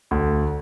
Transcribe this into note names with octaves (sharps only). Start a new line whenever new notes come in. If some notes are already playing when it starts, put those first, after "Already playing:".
D2